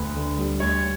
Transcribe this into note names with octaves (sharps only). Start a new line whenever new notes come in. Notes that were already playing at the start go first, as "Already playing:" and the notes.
Already playing: D2 B4
D3
G3
D2 C#5